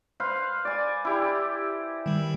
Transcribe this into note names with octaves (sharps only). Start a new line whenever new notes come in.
B4 C5 F5
D5 G#5
E4 G4
D#3 G3